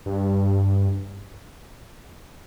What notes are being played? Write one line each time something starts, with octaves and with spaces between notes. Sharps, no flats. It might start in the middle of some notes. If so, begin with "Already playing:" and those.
G2